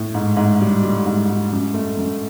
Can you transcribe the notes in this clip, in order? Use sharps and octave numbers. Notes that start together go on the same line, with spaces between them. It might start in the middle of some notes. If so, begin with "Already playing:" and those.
Already playing: A2
G#2
G#2
G3
G3
G#2
G#2
F#2
A3
F#2